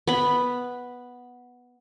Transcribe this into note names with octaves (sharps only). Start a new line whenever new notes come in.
B3 B5